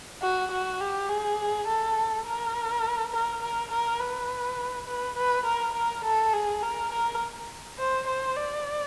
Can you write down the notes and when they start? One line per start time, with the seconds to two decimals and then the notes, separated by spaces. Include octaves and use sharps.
0.22 F#4
0.51 F#4
0.81 G4
1.10 G#4
1.68 A4
2.26 A#4
3.12 A#4
3.42 A#4
3.71 A#4
4.00 B4
4.87 B4
5.17 B4
5.45 A#4
5.75 A#4
6.04 A4
6.34 G#4
6.63 A#4
6.92 A#4
7.79 C5
8.07 C5
8.36 D5